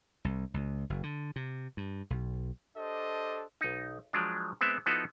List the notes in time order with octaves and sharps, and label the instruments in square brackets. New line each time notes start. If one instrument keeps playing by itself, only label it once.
[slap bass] C2
C#2
F#1
D3
C3
G2
B1
[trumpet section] D4 G4 A4 C5 D#5
[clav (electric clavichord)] B1 D#4
F3 F#3 G#3 D4
G#3 B3 C4 D4 E5
F3 B3 D#4 E4 F#4 A4